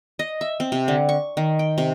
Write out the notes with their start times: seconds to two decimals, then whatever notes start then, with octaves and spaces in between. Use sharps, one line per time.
0.19 D#5
0.41 E5
0.60 C4
0.72 C3
0.88 D3
1.09 C#6
1.37 D#3
1.59 G5
1.78 C3